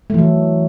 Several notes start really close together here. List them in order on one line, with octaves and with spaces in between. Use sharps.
A3 E3 F#3